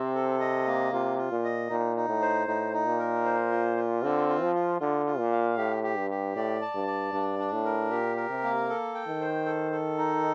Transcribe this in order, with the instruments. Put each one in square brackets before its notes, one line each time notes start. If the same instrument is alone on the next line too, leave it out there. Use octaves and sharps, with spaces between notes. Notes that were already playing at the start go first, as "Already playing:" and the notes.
Already playing: [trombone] C3 [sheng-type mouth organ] C4
[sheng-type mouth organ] A4
D#5
A#3
[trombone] C3 [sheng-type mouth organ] F4
[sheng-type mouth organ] F4
[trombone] A#2
[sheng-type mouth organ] D#5
[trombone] A#2 [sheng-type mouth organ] D#4
[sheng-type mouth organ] D#4
[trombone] A2
[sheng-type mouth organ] C5
[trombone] A2 [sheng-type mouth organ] D#4
[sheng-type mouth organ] D#4
[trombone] A#2
[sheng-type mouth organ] A#4
C5
F4
F4
[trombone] D3 [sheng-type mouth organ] C4
[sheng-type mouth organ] F4
[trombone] F3
[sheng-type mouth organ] F4
[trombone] D3 [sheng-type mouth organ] F4
[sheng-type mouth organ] F4
[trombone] A#2
[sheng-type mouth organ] F5
[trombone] A2 [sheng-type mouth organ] G4
[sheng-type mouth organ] G4
[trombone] G2
[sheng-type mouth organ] G4
[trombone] A2 [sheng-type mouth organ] D5
[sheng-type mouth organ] A5
[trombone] G2
[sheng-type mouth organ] D5
[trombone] G2 [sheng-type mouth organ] D4
[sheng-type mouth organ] D4
[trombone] A2
[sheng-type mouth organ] A#4
[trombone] A#2 [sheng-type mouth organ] G4
[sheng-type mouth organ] A#4
[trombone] C3
[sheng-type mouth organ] A#3
A4
G5
[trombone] D#3
[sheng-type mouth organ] C5
A4
A4
D#4